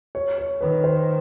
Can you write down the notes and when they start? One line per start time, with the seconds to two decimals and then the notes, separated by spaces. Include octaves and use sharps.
0.15 C#5
0.38 C#5
0.61 D#3 B4
0.84 C5